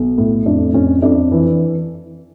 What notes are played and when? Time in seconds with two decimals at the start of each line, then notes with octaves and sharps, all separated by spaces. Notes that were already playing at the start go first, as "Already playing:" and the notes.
Already playing: B1
0.18 A2
0.46 F2 D4
0.74 F2 C#4
1.02 F2 D4
1.32 E3